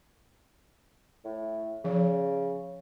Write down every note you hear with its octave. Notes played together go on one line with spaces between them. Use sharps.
A2
C#3 F3